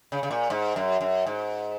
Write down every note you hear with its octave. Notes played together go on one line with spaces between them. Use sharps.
C#3
C#3
A#2
G#2
F#2
F#2
G#2